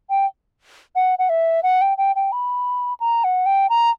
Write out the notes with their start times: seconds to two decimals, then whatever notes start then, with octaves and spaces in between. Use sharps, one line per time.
0.10 G5
0.96 F#5
1.19 F#5
1.29 E5
1.63 F#5
1.81 G5
1.98 G5
2.16 G5
2.32 B5
3.00 A#5
3.24 F#5
3.46 G5
3.70 A#5